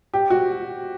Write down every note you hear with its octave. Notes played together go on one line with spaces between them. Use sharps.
G4
F#4